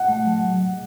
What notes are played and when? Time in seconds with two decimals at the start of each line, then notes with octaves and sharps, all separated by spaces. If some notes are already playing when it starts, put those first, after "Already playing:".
Already playing: F#5
0.08 A3
0.26 F#3